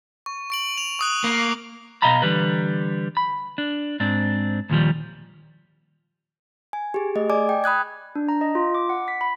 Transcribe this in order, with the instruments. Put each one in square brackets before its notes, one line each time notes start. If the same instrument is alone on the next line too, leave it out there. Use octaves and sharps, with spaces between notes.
[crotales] C#6
C#6 D7 F#7
F7
C#6 D#6 F#6
[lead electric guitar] A#3
[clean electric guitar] B2 D#5 F5 A#5 B5
D3 E3 G3 B4
B5
D4
G#2 C4 D4
D#2 A#2 D#3 F3 G3
[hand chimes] G#5
G4 G#4
A3 G#4 D#5
D5 D#5 G#5 D6
G5
B5 D#6 F#6 G#6
[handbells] D4
A#5
D#5
F4
D6
F#5
B6
B5